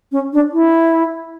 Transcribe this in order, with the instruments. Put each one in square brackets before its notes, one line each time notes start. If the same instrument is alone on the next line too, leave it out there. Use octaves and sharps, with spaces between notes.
[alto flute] C#4
D4
E4